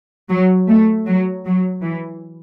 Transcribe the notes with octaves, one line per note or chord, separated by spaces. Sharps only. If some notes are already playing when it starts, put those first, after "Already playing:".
F#3
A3
F#3
F#3
E3